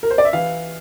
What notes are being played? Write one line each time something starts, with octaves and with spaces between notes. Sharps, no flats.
A#4
C5
D5
E5
E3 F5